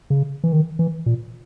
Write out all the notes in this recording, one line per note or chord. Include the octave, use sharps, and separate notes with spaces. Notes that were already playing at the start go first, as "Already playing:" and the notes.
C#3
E3
D#3
E3
A#2